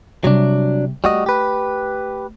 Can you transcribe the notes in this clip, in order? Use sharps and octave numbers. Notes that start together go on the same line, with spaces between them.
C3 F#3 G3 D4
G3 A3 F#4 D#5
G4 B4